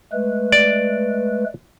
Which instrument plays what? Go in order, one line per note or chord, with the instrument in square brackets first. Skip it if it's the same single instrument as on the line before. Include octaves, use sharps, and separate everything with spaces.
[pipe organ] G#3 A3 B4
[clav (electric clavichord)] D5